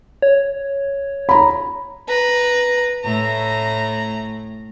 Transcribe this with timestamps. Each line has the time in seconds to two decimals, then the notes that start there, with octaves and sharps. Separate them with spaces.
0.22 C#5
1.29 A#5 B5
2.09 B4 A#5
3.04 A2 A#5